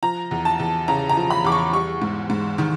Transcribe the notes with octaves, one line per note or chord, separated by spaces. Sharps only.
F3 A#5
E2
A5
E2
C#3 A#5
A#5
F3
B5
E2 D6
C#6
G3 C#6
G#2
G#2
D#3